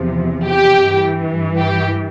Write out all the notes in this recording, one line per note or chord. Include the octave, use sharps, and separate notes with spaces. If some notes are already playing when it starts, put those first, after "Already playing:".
Already playing: E2 C3 F3
G4
G2 E3
G4